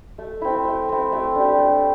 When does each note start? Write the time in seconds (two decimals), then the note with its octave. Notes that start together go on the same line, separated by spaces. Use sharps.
0.18 A3
0.41 C4 E4
0.65 A3
0.89 C4 E4
1.12 A3
1.35 D4 G4
1.58 A3